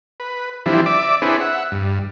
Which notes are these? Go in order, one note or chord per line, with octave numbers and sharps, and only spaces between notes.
B4
E3 F3 G3 C4 D4 E4
D5 E5 D6
C4 D4 E4 G#4 B4 C#5
E5 F#5
G2